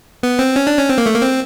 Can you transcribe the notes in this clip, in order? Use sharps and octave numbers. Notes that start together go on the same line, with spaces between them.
B3
C4
C#4
D4
C#4
C4
A#3
A3
A#3
C4